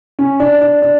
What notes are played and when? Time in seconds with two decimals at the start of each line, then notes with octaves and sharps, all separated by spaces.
0.19 C#4
0.40 D4
0.61 D4
0.82 D4